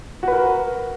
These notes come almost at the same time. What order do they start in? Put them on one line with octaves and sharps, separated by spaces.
F#4 B4 A#4